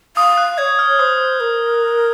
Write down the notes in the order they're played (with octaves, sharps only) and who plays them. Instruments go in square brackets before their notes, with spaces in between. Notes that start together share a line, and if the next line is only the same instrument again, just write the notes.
[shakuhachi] F5 [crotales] D#6
[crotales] F#6
[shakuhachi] C#5 [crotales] G#6
[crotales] F6
[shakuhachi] C5 [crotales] D#6
[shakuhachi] A#4